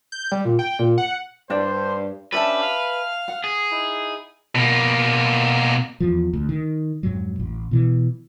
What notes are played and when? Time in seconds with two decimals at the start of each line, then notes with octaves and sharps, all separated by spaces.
0.12 G6
0.32 G3
0.45 A#2
0.59 G5
0.79 A#2
0.98 F#5
1.50 G2 D4 C5
2.32 C#4 D4 G4 A4 B4 E5 A5
2.62 F5 F6
3.28 F#5
3.44 G#4
3.71 D#4 E4
4.55 B2 A#3
6.00 E2 F3
6.34 D2
6.49 D#3
7.03 F2 G#2 F#3
7.40 A1
7.71 B2 E3